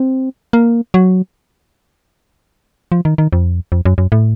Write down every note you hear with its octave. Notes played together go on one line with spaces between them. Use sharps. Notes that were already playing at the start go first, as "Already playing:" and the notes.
Already playing: C4
A#3
F#3
F3
D#3
D#3
F2
F2
F#2
F#2
A2